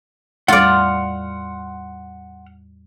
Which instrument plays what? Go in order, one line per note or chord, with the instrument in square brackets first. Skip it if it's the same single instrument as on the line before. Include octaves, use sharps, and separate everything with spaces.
[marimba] E2 A2 G3 [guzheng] F4 D5 [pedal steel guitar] F#5 C6 F6